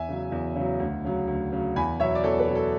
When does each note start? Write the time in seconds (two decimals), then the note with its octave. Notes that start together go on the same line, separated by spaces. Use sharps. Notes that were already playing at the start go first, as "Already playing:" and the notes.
Already playing: E2 E5 G#5
0.09 C#3 F#3
0.32 E2
0.56 C#3 F#3
0.79 D2
1.04 C#3 F#3
1.27 D2
1.52 C#3 F#3
1.76 E2 G#5 B5
2.00 B2 F#3 C#5 E5
2.15 D5
2.24 E2 A4 C#5
2.39 B4
2.48 B2 F#3
2.55 A4